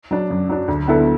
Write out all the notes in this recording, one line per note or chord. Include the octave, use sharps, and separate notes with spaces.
F#3 D4
F#2
F#3 D4
D2
D3 B3 E4 A4